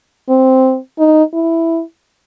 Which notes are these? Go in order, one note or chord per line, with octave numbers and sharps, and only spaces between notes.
C4
D#4
E4